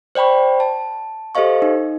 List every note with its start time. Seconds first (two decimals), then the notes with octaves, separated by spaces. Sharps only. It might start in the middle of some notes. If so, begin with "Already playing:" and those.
0.15 C5 D5 G5 B5 C#6
0.60 A5
1.35 G4 A4 C5 D#5 F5 C#6
1.62 D#4